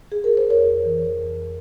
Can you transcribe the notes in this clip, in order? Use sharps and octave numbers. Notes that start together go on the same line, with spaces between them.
G#4
A#4
C5
F2 A#4 C#5
E3
F2